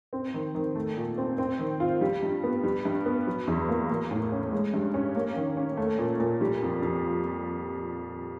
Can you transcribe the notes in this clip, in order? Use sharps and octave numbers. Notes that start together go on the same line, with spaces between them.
C4
D#3
D#3
A3
A#2
C4
C4
D#3
F4
G3
G2
B3
G3
G2
B3
F#3
E2
A#3
A#3
A2
C#4
G#3
G2
C#4
A#3
D#3
C#4
A3
A#2
A#2
G3
F2
F2